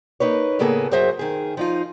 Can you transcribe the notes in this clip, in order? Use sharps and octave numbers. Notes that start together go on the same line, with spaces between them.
A#3 D#4 B4 C#5
A2 C#3 A#3 B3 G#4 A4
F#2 F#3 G#4 C5 E5
D#3 G#4
F3 D#4 F4